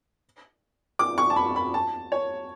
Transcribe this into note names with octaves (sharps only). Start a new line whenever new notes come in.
D6
C#6
A5
B5
B5
A5
C#5